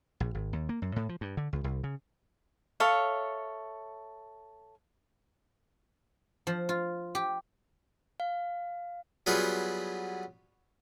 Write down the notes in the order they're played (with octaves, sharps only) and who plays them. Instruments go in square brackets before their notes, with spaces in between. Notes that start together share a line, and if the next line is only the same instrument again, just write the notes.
[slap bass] A#1
G#1
D#2
A#3
F#2
A2
F3
G2
D3
C#2
C2
C#3
[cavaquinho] A4 C#5 E5 F5
[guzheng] F3
F4
G4
[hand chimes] F5
[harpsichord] F#3 G3 B3 F4 G#4 B4